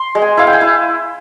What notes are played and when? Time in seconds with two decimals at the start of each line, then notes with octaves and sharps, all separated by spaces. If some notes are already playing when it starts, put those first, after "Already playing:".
Already playing: C6
0.15 G#3
0.22 G#5
0.37 E4 F5
0.47 G5
0.53 G#5
0.61 E4